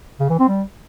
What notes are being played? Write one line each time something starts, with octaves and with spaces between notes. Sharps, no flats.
C#3
E3
C4
G3